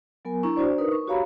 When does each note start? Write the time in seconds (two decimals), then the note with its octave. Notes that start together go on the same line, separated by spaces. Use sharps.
0.25 F#3 B3 A#4 G#5
0.43 D4 E4 A#5 C#6
0.57 D4 F#4 C5 D5
0.78 D#4 A#4 B4 D#6
0.91 C#6
1.07 F#4 G4 C#5 F5 A#5 B5